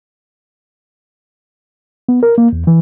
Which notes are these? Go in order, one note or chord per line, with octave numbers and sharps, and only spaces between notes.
B3
A#4
A#3
E2
E3